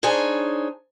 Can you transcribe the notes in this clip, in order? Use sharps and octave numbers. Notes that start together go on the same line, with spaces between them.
D4 D#4 G#4 C5 C#5 G#5